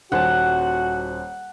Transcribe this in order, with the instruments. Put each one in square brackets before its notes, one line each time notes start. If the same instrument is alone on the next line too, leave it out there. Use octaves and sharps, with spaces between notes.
[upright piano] D#1 C5 G#5 [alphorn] F#4 [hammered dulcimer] F#5 A5